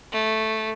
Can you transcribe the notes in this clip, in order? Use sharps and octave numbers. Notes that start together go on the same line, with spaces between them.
A3